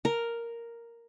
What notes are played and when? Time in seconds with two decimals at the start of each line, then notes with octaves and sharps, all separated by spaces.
0.05 A#4